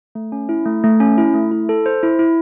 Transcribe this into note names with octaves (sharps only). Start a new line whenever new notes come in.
A3
C#4
E4
A3
A3
C#4
E4
A3
E4
A4
C5
E4
E4